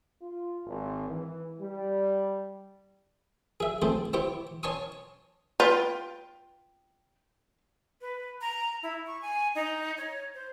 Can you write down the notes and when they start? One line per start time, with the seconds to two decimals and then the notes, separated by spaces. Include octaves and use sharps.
0.22 F4
0.66 G#1
1.09 E3
1.62 G3
3.60 G#4 E5
3.82 A3 C4 G#4 A4 C5
4.13 E4 G4 C5 C#6 D6
4.63 C#5 G#5 A5 C6 C#6 D#6
5.60 F4 B4 G5
8.01 B4
8.41 A#5
8.83 E4
9.07 C#6
9.22 G#5
9.55 D#4
9.98 C#5
10.34 C5